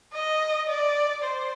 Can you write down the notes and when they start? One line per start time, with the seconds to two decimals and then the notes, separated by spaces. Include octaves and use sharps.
0.14 D#5
0.69 D5
1.24 C5